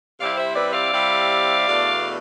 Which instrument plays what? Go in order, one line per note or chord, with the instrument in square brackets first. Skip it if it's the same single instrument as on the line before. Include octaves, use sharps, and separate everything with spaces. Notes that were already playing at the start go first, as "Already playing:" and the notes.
[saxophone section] C3 G3 C4 E4 D5 F5
C5 E5
B4 D5
D5 F5
C3 G3 C4 E4
E2 B2 A3 D4